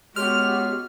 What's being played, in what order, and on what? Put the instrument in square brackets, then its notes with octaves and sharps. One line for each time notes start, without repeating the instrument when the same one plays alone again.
[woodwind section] C#2 G#3 B3 [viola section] F#4 [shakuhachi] G4 [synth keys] F6